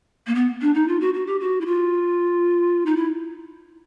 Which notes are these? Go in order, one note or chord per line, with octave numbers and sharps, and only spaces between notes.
A#3
B3
D4
D#4
F4
F#4
F#4
G4
F#4
E4
F4
D#4
E4